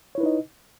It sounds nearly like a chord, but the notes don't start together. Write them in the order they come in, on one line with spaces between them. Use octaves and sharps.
C#5 E4 B4 D#4 D#5